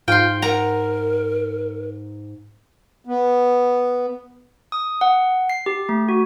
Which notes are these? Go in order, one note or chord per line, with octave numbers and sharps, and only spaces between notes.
G#2 F4 G5 C6
A#4 F#5 A#5
B3
D#6
F#5
C7
G4
A3
F#4